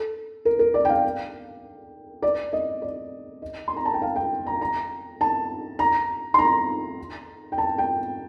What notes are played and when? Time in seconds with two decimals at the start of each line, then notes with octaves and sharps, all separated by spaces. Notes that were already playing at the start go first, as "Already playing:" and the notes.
Already playing: A4
0.45 A#4
0.59 A#4
0.74 D5
0.85 G5
0.89 F5
2.22 D5
2.53 D#5
2.82 D5
3.42 D#5
3.68 C6
3.76 A#5
3.85 A5
3.94 G5
4.02 F5
4.16 G5
4.47 A#5
4.61 A#5
5.21 A5
5.79 A#5
6.34 C6
6.39 A#5
7.52 G5
7.58 A5
7.78 G5